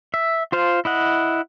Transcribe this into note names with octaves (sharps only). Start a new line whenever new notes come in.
E5
F4 C5 F5
E4 D#5 F#5